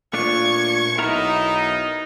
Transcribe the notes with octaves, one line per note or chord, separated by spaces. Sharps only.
A#2 A3 D4 F4 C#6 G#6
B1 B3 D#4 E4 A#4 E5 A#5